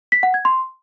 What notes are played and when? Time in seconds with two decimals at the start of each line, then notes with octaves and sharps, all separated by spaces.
0.12 B6
0.23 F#5
0.34 G#6
0.45 C6